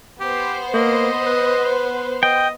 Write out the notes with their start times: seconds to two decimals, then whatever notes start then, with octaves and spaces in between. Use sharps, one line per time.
0.20 B3 G4 C5
0.74 A#3 D#5
1.26 B4
2.23 D#5 G5